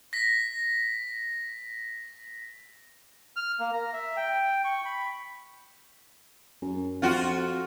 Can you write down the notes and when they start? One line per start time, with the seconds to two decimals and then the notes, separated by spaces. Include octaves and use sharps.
0.13 A#6 B6
3.36 F6
3.59 A#3
3.73 A#5
3.93 E5
4.16 G5
4.65 C#6
4.85 B5
6.62 F#2
7.02 F2 F4 F#4